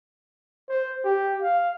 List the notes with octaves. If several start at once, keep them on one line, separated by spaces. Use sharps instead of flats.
C5
G4
F5